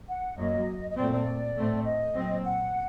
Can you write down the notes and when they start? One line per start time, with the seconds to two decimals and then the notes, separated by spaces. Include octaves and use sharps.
0.08 F#5
0.37 F#2 F#3 A#3 D#5
0.90 D#5
0.96 A#2 A3 C4 D5
1.11 D5
1.56 A2 A3 C4
1.84 D#5
2.14 A#2 F#3 C4
2.44 F#5